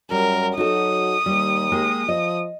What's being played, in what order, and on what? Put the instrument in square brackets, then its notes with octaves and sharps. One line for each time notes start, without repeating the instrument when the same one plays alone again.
[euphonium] F#2 [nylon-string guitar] G3 [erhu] A#4
[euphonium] F#3 [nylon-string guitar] D#4 F#4 A4 [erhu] D#6
[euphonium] D#2 [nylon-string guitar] G3
[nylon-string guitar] G#3 A#3 G4
[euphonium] F3 [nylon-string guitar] D#5